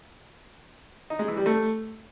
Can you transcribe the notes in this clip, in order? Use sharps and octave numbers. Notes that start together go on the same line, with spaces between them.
D#4
G#3
E3
G3
A3